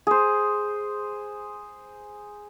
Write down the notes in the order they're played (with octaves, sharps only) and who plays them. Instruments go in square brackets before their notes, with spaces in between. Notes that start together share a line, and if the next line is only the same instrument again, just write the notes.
[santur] G#4 C5